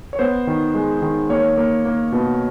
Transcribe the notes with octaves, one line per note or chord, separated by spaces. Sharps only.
C#5
B3 C5
D#3
G#3
D#3
A#3 C#5
A#3
A#3
B2